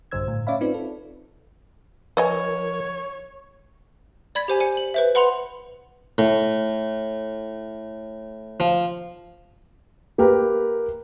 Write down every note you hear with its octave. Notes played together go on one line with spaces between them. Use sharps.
A#1 G2 D3 C5 E6 G#6
A2
C#4 C#5 D5 E5 F5 B5
C4 D#4 F4 B4 D5
A4
F3 A#4 B4 C#5 D#5 G#5
D5 B5 G#6 B6
G4 C5 G#5
C5 G#5 C#7
F#7
B4 C5 E5
B4 F#5 B5 C6 C#7 F7
A2
F3
A#3 G4 A#4 B4